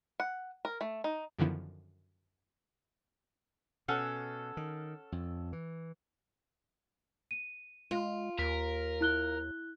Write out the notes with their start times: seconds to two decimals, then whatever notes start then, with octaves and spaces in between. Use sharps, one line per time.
0.20 F#5
0.65 A#4
0.81 A3
1.04 D#4
1.39 F#2 D3 D#3 F3 B3 E4
3.88 B2 C#4 A4 F#5
4.57 D#3
5.12 F2
5.53 E3
7.31 D#7
7.91 G#3 F4
8.39 D#2 A#4 B6
9.01 E4 F#6 G7